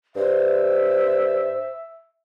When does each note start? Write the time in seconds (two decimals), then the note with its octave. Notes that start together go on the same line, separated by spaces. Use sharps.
0.16 G2 C5 E5